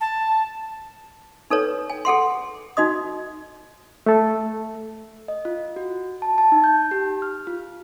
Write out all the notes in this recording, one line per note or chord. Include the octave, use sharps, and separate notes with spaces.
A5
D#4 A4 B4 C#5
G#5
G#4 A4 F#5 C6
D#4 F#4 D#5 D#6
A3 A4
D#5
F4
F#4
A5
A5
D#4
G6
G4
F6
F4